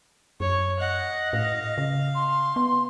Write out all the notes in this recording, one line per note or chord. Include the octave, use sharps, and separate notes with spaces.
F#2 C#5
D#5 F#5
A2 F5
C#3
C6
B3